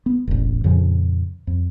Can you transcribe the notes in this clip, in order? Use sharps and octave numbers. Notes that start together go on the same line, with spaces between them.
B3
E1 A1
F2 A#2 C#3 F3
F2